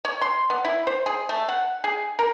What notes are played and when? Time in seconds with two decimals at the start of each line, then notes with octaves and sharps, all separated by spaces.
0.05 C#5
0.21 C6
0.50 B3
0.65 E4
0.87 C5
1.06 G#4
1.29 A3
1.49 F#5
1.84 G#4
2.19 A#4